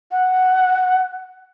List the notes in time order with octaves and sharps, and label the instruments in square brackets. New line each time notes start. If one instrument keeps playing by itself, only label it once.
[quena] F#5